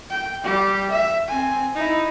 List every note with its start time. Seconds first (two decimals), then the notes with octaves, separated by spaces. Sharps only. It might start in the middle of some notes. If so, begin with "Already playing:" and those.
0.11 G5
0.45 G3 G4
0.91 E5
1.29 C4 G#5
1.75 D#4 E4